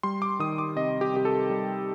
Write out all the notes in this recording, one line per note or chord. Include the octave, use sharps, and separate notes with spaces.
G3 C6
D6
D#3 D#6
D6
C3 D#5
G4
C3 G4
A4
G3